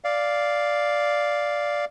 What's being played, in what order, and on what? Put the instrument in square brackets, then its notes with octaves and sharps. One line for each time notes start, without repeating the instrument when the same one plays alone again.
[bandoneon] D5 F5